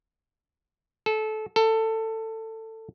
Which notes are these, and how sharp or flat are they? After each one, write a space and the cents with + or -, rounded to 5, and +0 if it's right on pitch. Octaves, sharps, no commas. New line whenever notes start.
A4 -25
A4 +15